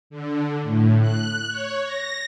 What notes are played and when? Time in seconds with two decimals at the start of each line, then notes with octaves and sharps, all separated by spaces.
0.10 D3
0.63 A2
1.01 F#6
1.50 C#5
1.85 A#6